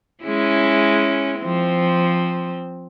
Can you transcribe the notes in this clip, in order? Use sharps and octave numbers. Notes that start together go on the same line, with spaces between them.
G#3 C#4 E4
F3 C4